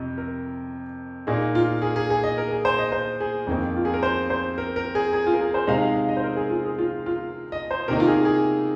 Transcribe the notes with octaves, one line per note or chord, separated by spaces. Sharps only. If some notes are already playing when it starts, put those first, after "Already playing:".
Already playing: F2 C3 D#5
A#4
A#2 A#3 D#4 G#4
F4
G#4
G#4
G#4
D#5
A#4
G#4
C5
D#5
C5
G#4
F2 D#3 A#3 D#4
F4
G#4
A#4
C5
C5
A#4
A#4
G#4
G#4
F4
A#4
G#4
C5
C3 G#3 D#4 F5
F5
F5
D#5
C5
A#4
G#4
F4
G#4
F4
F4
D#5
C5
C3 D#3 A#3 D#4 A#4
F4
G#4
G#4